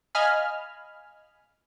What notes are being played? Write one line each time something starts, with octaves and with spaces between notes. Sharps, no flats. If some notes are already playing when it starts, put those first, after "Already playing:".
D#5 F5 G#5 B5 F6